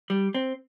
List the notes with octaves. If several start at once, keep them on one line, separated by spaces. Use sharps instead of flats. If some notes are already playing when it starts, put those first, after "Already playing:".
G3
C4